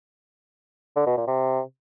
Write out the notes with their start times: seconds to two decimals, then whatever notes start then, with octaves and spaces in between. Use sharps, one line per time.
0.96 D3
1.07 B2
1.17 A#2
1.28 C3